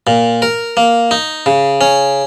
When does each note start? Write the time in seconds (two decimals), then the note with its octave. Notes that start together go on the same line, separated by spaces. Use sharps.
0.07 A#2
0.42 A#4
0.77 A#3
1.11 D#4
1.46 C#3
1.81 C#4